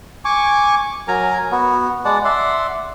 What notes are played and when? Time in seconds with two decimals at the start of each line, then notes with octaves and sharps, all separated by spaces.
0.25 G#5 C#6 D6
1.08 F#3 A#4 G#5 A#5
1.51 B3 F#4
2.05 G#3 D5 F#5 A5
2.25 D5 E5 F#5 C6